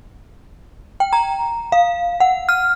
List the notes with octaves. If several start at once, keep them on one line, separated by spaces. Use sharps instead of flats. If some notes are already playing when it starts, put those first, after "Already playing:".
G5
A#5
F5
F#5
F6